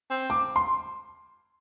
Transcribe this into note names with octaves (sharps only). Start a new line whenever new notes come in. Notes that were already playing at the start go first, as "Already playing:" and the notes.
C4
D6
C6